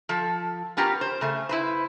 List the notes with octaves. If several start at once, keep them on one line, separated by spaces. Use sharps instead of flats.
F3 A4
B3 C#4 F4 G4 A#4
C5
C#3 A3
E4 B4 C5